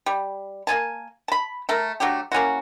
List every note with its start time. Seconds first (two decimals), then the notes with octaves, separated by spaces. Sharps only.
0.06 G3
0.67 A#3 D#4 G#5 A5
1.28 A5 B5
1.69 A3 A4 A#4
2.00 F#3 A3 D4 G4
2.32 A#3 C#4 E4 F#4